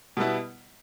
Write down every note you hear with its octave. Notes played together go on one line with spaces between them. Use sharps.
B2 G3 B3 E4